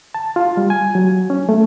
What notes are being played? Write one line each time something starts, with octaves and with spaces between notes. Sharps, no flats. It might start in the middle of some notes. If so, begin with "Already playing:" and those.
A5
F4
G3
G#5
F#3
C#4
A3